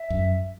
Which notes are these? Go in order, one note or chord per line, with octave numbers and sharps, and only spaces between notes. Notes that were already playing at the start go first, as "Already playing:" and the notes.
Already playing: E5
F#2